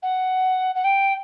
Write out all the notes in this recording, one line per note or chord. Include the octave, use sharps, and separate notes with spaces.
F#5
F#5
G5